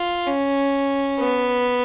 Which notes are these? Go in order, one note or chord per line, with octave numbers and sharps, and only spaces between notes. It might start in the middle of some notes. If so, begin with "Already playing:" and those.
Already playing: F4
C#4
B3